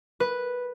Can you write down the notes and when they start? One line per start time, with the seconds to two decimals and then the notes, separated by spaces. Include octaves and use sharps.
0.20 B4